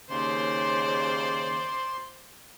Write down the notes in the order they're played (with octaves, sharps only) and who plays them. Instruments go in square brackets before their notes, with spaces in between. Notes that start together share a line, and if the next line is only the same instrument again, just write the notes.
[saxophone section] D#2 C#3 [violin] C5 D5 [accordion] C6